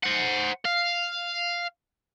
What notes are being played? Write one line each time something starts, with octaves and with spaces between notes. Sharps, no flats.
C5 F#5
F5